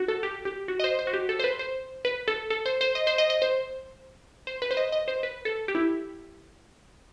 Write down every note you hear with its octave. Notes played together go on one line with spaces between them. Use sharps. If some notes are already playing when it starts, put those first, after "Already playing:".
Already playing: F#4
A4
G4
G4
F#4
D#5
C5
C5
F#4
G4
A4
C5
B4
C5
B4
A4
A4
C5
C5
D#5
C5
D#5
D#5
C5
C5
B4
C5
D#5
D#5
C5
B4
A4
G4
E4